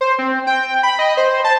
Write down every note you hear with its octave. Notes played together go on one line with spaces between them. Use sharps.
C5
C4
G5
B5
D#5
C5
A5